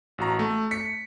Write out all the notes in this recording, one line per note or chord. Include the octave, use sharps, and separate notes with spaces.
A1 F#4 A#5
A3
B6 C#7